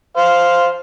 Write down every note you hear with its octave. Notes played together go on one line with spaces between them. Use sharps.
C5 F5